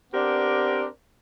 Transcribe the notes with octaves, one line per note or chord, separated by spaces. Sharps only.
B3 C4 D4 G4 A#4